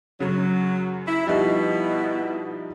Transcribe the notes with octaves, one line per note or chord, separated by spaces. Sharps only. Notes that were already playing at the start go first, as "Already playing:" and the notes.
F#2 C#3 F#3
E4
B2 F3 G3 D#4 E4